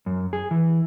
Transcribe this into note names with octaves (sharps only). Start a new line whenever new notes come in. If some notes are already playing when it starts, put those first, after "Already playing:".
F#2
G#4
E3